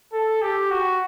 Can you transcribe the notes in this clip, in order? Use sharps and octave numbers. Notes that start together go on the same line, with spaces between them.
A4
G4
F#4